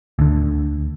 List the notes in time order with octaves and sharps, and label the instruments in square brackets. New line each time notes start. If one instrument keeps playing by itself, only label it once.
[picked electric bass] D2 D3